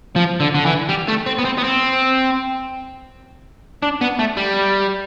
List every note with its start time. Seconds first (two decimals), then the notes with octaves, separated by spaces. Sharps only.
0.16 F3
0.40 D3
0.55 D3
0.66 E3
0.89 G3
1.08 A3
1.26 C4
1.38 B3
1.45 C4
1.58 B3
1.63 C4
3.83 D4
4.01 B3
4.19 A3
4.37 G3